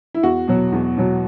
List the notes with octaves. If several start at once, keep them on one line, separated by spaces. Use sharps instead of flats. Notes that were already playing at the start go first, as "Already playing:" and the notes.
E4
E2 F#4
B2 F#3
E2
B2 F#3